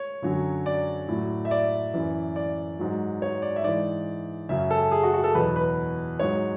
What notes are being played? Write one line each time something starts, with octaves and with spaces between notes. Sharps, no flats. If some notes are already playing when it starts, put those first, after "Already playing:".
Already playing: C#5
F#2 D3 F#3
D5
A2 F#3
E5
D5
F#2 E3
D5
G#2 F#3
C#5
D5
E5
G#2 E3 D5
F#2 C#3 F#3 E5
A4
G#4
F#4
F#4
A4
E2 B2 F#3 B4
B4
G#2 F#3 C#5